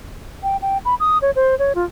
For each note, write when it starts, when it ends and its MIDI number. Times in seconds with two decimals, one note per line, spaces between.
0.43 0.57 79
0.62 0.78 79
0.85 0.95 83
1.00 1.18 87
1.22 1.31 73
1.36 1.57 72
1.59 1.73 73
1.75 1.85 65